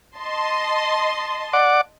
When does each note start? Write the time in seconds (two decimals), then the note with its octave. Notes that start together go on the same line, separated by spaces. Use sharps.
0.18 D#5 A5 C6
1.53 D5 F#5 D6